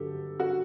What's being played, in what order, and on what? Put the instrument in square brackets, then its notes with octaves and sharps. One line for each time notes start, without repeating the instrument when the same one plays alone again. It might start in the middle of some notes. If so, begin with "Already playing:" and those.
Already playing: [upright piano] G2 D3 F#3 G4 A4
F#4